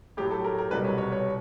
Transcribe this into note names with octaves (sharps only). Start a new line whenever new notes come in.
A2 F#3 G4
A4
A#4
A#4
C2 B2 G3 B4
C#5
C#5
C#5